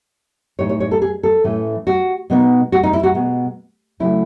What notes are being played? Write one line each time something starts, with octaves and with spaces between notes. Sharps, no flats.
A2 G#3 D#4 C#5
C#5
C#5
A4
G#4
A4
A2 E3 A3 C#4
F#4
B2 G#3 B3 D#4
F#4
D#4
E4
F#4
B2 G#3 B3
C#3 F#3 A3 E4